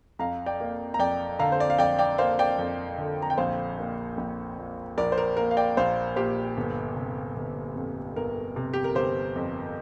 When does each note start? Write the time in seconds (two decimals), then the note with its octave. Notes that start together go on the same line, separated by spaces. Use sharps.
0.19 F2 F5 A#5
0.46 D5 G5
0.60 A#3
0.94 A#5
0.99 F2 D5 G5
1.39 D3 F5 A#5
1.52 C5
1.60 D5
1.70 F5
1.78 F2 D5 G5
1.99 D5 G5
2.18 A#3 C5 F5
2.39 D5 G5
2.59 F2
2.98 D3
3.22 A#5
3.30 G5
3.38 A#1 C5 F5
3.79 A#3
4.17 A#1
4.58 A#2
4.97 A#1 A#4 D5
5.12 C5
5.18 A#4
5.37 A#3 A#4
5.51 F5
5.57 D5 G5
5.77 A#1 C5 F5
6.16 A#2 G4 C5
6.57 G1
6.96 C3
7.36 G1
7.75 F2
8.16 G1 A#4
8.56 C3
8.73 G4
8.84 A#4
8.95 G1 G4 C5
9.36 F2